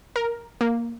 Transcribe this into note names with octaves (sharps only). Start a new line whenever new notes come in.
A#4
A#3